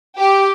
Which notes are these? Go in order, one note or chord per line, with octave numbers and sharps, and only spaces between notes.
G4